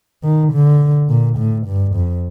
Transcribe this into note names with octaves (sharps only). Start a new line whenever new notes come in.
D#3
D3
A#2
A2
G2
F2